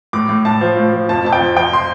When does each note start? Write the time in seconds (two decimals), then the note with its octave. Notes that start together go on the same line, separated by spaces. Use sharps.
0.13 A2 D6
0.29 A2
0.45 A2 A5
0.61 F3
0.77 A2
0.93 F3
1.09 F2 A5
1.25 F2 A5
1.33 G5
1.40 F2
1.56 F3 G5
1.73 C6